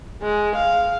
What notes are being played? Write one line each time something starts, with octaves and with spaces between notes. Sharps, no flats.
G#3
F5